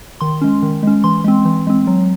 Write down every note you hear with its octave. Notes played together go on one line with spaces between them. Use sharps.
D#3 C6
G#3 C#4
D#3
G#3 C#4
E3 C6
G#3 C4
E3
G#3 C4
F#3